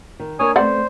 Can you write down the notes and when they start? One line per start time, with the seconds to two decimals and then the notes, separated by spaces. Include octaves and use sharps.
0.20 D#3
0.39 A#3 D4 A#4 C#5 G#5 D#6
0.56 A3 B3 C4 C5 D5 F#5